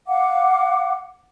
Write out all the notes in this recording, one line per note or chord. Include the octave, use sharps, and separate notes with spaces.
F5 F#5 D6